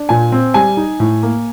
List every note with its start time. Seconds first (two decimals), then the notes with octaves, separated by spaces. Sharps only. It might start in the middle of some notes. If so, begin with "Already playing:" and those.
Already playing: D4
0.09 A#2 G#5
0.32 C4
0.54 G3 G#5
0.77 D#4
1.00 A2
1.23 A#3